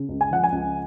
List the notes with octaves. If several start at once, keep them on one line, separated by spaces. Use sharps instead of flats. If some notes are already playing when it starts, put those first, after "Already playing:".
Already playing: C#3
C#2
G#5
F3 F#5
G#5
C#2